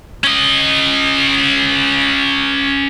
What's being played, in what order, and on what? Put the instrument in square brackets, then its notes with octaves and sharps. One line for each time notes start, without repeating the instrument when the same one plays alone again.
[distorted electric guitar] C#4 D#5